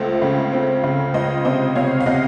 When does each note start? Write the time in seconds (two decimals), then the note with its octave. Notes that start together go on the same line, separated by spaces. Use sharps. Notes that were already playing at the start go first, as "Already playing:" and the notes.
Already playing: C#2 A3 C4 C5
0.22 C#3
0.53 C4
0.84 C#3
1.14 C#2 C5 D#5
1.45 C3 C5 D#5
1.75 C3 C#5 F5
2.00 F5
2.06 C3 D#5 F#5